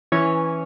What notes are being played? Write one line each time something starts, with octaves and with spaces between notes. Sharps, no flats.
E3 C#4 C#5